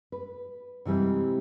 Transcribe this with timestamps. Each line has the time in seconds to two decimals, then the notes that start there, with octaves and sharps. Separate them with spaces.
0.12 B4
0.85 C3 E3 G3 G#3 C4